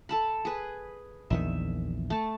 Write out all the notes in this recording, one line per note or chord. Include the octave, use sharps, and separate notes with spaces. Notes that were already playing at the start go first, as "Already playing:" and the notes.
A4 A5 B5
G#4 B4
A#1 E2 D#3 E5
A3 A5